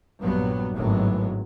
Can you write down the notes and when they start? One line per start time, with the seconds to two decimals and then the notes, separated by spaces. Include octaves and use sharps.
0.21 A#1 G2 A#2 F#3 G3 B3
0.74 G#1 A2 F#3 G#3 B3